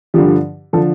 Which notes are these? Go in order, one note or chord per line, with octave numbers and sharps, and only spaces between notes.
G2 D3 F3 G4
D3 F3 A4